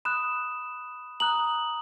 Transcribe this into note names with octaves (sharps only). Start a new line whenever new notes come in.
B5 D#6 F#6 E7
A#5 D#6 F#6 F#7